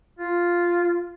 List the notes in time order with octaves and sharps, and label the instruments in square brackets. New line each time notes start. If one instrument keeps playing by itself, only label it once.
[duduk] F4